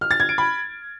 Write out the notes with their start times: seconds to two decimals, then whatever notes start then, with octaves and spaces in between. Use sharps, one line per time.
0.01 F6
0.11 A6
0.20 G#6
0.29 D7
0.38 B5